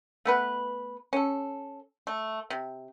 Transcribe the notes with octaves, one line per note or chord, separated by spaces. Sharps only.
A3 B3 B4
C#4 A4
A3
C3